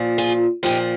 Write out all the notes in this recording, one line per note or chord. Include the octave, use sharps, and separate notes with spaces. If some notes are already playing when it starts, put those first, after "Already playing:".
Already playing: A#2 F3
F4 G#4
A#2 F3 D#4 G4